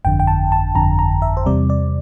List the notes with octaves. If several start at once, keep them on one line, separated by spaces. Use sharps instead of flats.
G1 F2 D3 G5
G5
A5
A5
G1 F2 D3 A#5
A#5
E5
C5
E2 C3 G3 C4 D5
D5